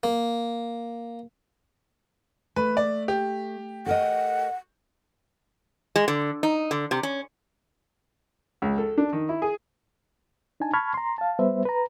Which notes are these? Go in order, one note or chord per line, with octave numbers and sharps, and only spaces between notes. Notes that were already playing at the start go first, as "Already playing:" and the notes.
A#3
A3 B4
D5
G4
A4 A#4 D#5 F#5
G#3
D3
D#4
D3
C3
C#4
C#2
A4
D4
D#3
E4
G#4
D4 D#4 G#5 A5
A5 B5 C#6 F6 G#6
A#5 C6
F5 A5
G3 B3 B4 C5 E5
B4 A#5